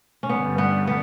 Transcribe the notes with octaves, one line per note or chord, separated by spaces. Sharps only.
C#4
G2 D3 G3 B3
B3
B3